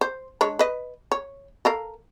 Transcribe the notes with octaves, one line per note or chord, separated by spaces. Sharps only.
C5
G#3 D4 C#5
B4 D#5
C#5
A4 A#4 F5